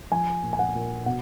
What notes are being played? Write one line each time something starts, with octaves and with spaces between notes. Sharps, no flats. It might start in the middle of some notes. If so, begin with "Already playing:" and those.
F3 G#5
A#2
G#5
F#5
A#2
B2 F#5